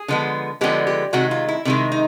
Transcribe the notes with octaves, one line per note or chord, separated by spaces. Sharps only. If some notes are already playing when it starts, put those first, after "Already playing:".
Already playing: G#4
D3 F3 G#3 B3
D3 F3 G#3 B3 G4
G4
C3 D#3 G#3 F#4
F4
E4
C3 D#3 G#3 E4
D#4